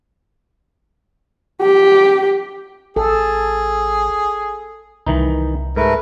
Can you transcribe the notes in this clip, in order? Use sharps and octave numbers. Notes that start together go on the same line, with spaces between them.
G4
A1 G#4 A4
C2 D#3 E3 D#4
G#2 A3 A#4 B4